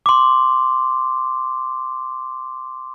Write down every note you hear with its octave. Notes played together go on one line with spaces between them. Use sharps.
C6 D6